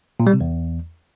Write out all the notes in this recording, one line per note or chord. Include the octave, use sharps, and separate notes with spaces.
A#2
G3
C3
E2